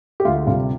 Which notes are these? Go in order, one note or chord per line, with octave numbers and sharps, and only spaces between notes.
G4
D2 F4
C3 G3 F4